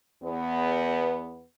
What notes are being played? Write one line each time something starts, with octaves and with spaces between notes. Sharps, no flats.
E2 B3